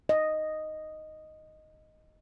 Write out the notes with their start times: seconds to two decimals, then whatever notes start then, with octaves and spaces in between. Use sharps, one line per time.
0.09 D#5